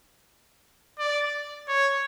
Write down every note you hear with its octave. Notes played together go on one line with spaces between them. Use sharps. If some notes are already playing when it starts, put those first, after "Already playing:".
D5
C#5